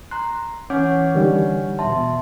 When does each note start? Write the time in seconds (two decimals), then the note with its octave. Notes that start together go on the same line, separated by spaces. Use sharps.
0.11 A#5 C6 F#6
0.70 E3 C#4 C#5 F#5 D6 G6
1.14 D3 D#3 G3
1.79 E2 B2 E5 A5 C6